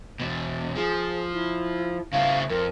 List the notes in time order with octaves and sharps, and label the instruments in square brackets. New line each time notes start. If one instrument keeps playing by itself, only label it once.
[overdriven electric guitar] E2 B2
[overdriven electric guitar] F3 [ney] G#4
[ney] E4
[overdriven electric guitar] C#3 E4 [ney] F5
[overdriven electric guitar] F2 [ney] A#4